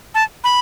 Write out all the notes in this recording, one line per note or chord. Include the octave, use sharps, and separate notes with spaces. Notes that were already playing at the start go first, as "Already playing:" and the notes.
A5
B5